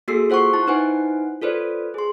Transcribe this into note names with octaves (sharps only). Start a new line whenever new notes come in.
A#3 F#4 G#4 A4 E6 C7
F4 C5 F#5 C6 C#6
E4 A5
D#4 E4 B4 C5 F#5 G#5
F4 A4 B4 C5 D5
G#4 C6